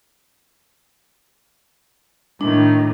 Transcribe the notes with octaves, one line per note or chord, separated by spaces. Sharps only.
A2 D#3 D4